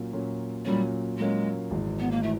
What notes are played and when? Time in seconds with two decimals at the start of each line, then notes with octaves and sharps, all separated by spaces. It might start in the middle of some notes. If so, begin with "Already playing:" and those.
Already playing: A#2 F#3 A#3 C#4
0.13 A#2 F#3 A#3 C#4
0.65 A#2 F#3 G3 A#3 C#4
1.18 A#2 F#3 G#3 A#3 C#4
1.71 G#1 G#2 E3
2.00 B3
2.11 A#3
2.23 E3 A3